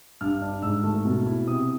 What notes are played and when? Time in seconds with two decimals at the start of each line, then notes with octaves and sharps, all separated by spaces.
0.21 G2 F6
0.42 D4
0.62 G#2 E6
0.84 A3
1.05 B2
1.26 E4
1.47 C3 D#6